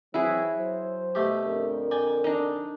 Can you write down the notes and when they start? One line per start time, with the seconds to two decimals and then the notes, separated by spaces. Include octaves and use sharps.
0.14 E3 F#3 C4 E4 F#4 G#4
0.56 F#3 C5
1.15 B2 A3 G4
1.44 F2 D3 A#4
1.91 D5 G5 G#5
2.24 D4 D#4